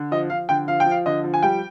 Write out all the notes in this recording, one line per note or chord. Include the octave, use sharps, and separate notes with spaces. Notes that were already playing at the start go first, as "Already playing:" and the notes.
Already playing: D3
F3 D#5
F3 F5
D3 G5
F3 F5
G5
F3
F5
D3 D#5
F3
G#5
G3 G5